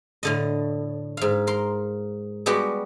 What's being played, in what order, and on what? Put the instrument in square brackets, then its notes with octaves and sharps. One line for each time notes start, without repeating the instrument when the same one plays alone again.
[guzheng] A2 D3 D#5
G#2 F5
A#4 C6
G3 G#3 B3 F#4 G4